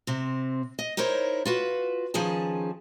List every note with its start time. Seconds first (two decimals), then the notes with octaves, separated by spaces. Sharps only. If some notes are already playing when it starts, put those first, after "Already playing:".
0.07 C3 C4
0.79 D#5
0.97 D#4 E4 A#4 C5 C#5
1.45 F4 F#4 B4
2.14 D#3 F3 C#4 G#4 A5